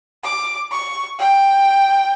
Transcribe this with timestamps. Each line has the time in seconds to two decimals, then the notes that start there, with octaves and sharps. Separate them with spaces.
0.24 D6
0.72 C#6
1.19 G5